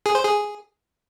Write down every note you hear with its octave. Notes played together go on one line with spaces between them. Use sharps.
G#4
C5
G#4